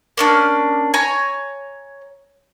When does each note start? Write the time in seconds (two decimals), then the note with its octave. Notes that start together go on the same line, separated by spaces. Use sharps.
0.17 A#3 C#4 D4
0.94 C#5 G#5 A#5